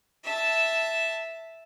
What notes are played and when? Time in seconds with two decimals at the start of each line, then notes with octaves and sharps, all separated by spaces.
0.24 E5 A5